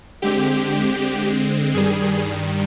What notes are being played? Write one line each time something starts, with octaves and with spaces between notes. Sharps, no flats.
D3 G#3 C4 G4
G2 D#3 G3 G#4